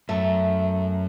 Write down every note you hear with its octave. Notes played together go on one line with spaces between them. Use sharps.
F#2 A3